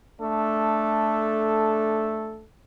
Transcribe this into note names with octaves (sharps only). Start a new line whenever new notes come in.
A3 D4 A4